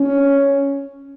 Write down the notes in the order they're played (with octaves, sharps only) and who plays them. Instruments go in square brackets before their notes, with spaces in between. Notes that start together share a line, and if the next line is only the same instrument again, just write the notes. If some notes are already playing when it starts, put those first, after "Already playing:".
Already playing: [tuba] C#4